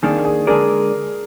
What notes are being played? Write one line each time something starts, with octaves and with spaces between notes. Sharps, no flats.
F2 D#3 A#3 D4 G#4
G#4
D3 G#3 D4 G#4 A#4 D5